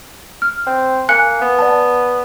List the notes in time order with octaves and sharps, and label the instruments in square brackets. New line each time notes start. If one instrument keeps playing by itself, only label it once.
[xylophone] F6
[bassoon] C4
[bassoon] A#3 [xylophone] G#5 F#6 C#7
[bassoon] B3
[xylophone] D5 F#5 A5